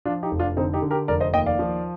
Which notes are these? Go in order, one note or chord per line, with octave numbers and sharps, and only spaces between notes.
F3 D4 F4
D#4 G4
F1
D4 F4
D3 C4 D#4
D#4 G4
D3
G4 A#4
F1 A#4 D5
C5 D#5
D#2 D#5 G5
D5 F5
F3